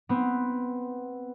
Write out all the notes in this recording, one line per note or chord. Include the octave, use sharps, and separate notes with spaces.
B3 C4